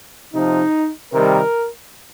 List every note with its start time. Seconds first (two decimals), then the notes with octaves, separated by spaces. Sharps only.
0.34 C3 F3 D#4
1.13 C3 D#3 G3 A#4